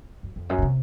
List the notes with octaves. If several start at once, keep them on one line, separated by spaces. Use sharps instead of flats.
F#2
F2
F#2
A#2
C3